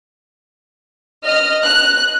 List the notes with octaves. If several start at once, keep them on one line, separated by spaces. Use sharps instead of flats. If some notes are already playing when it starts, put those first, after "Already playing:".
D#5 F6
F#6